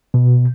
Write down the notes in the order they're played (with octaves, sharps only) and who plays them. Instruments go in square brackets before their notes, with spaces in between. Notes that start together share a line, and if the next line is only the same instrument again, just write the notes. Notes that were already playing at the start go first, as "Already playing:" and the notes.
[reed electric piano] B2